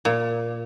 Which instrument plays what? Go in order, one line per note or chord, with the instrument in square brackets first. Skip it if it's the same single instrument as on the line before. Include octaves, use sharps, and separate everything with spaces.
[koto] A#2